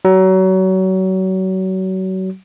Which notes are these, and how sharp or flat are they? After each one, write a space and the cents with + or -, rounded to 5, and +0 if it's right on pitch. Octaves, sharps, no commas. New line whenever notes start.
F#3 +30